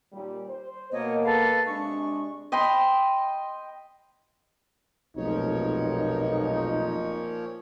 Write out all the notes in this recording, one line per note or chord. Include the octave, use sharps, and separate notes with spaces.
D#2 A#2 G3
C5
B2 A#3 C#5 D#5
A4 B4 F5
C3 G#3 D4 C#6
D#5 G5 B5 C6
F1 B1 A#2 F3 D#4 C#5